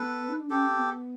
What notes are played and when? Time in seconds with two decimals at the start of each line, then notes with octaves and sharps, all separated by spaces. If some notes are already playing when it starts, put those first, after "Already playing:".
Already playing: B3 A4 B4
0.29 D#4
0.40 D4
0.50 C#4 G4 A4
0.69 C4
0.78 B3